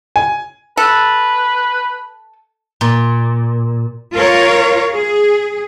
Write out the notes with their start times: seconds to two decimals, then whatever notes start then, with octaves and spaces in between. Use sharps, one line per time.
0.16 G#5
0.77 A4 B4
2.81 A#2
4.15 F4 A#4 C#5
4.92 G#4